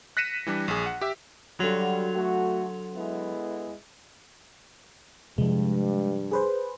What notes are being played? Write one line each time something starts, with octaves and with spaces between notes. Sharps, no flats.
F#6 A#6 B6 C#7 D#7 E7
E3 G3 D4
A#1 G#4
F#5
G4 E5
D3 F#3 G3 F4 F#4
A3 F#4
G#3 B3 E4
G2 C3 F3 G#3
G#4 B4 C5